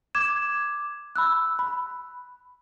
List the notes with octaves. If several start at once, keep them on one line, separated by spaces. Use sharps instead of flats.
D6 G#6 E7
B5 E6 F#6
B5